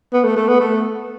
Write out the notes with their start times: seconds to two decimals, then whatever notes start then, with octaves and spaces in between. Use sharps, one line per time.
0.13 B3
0.24 A3
0.36 A3
0.49 B3
0.60 A3